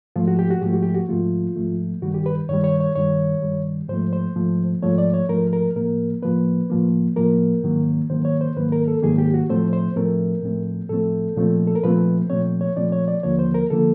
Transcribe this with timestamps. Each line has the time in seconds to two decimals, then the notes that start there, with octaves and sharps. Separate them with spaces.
0.16 G#2 F3 A3 F4
0.28 F#4
0.39 G4
0.51 F#4
0.61 G#2 F3 A3 G4
0.73 F#4
0.83 G4
0.94 F#4
1.08 G#2 F3 A3 F4
1.56 G#2 F3 A3
2.02 G2 D#3 G3 F#4
2.14 G4
2.26 B4
2.49 G2 D#3 G3 C#5
2.64 C#5
2.80 C#5
2.95 G2 D#3 G3 C#5
3.42 G2 D#3 G3
3.89 G#2 F3 A3 C5
4.13 C5
4.35 G#2 F3 A3
4.82 G#2 F3 A3 C#5
4.98 D5
5.14 C#5
5.29 G#2 F3 A3 A#4
5.53 A#4
5.76 A2 F3 A#3 A#4
6.22 A2 F3 A#3 B4
6.70 A2 F3 A#3
7.16 A2 F3 A#3 A#4
7.63 G#2 D#3 F#3 A#3
8.10 G#2 D#3 F#3 A#3 C5
8.25 C#5
8.41 C5
8.57 G#2 D#3 F#3 A#3 B4
8.72 A#4
8.88 A4
9.02 G#2 D#3 F#3 A#3 G#4
9.18 G4
9.34 F#4
9.49 A2 F3 A3 C4 C5
9.73 C5
9.96 A2 F3 A3 C4 A#4
10.43 A2 F3 A3 C4
10.89 A2 F3 A3 C4 A4
11.36 A#2 F3 A3 C4
11.67 A4
11.75 A#4
11.83 A#2 F3 A3 C4 B4
12.30 A#2 F3 A3 C4 C#5
12.61 C#5
12.76 A#2 F3 A3 C4 D5
12.92 C#5
13.08 D5
13.23 D#2 D3 F3 A#3 C#5
13.39 C5
13.54 A#4
13.70 D3 F3 A#3 A4